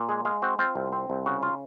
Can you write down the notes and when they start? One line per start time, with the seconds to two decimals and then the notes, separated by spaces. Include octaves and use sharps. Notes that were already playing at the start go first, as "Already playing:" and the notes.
Already playing: A#2
0.09 G#3 G#4
0.25 G#3 F5
0.42 C4 F#4
0.59 C4 F4
0.76 C2
0.92 C4
1.10 C2
1.26 C#3 F#4
1.43 F4